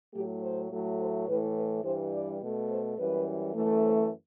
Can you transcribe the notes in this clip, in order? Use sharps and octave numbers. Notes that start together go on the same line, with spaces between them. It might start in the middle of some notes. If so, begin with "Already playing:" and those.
A2 F#3 A3 G4
C5
A2 F#3 A3
C5
A2 E3 A3 B4
B4
G2 E3 G3 C5
D5
B2 A3
C5
F#2 E3 G3 B4
F#2 E3 A3
C5